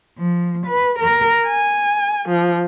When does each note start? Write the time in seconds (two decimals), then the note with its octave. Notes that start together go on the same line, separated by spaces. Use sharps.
0.18 F3
0.66 B4
0.99 A#4
1.46 G#5
2.28 F3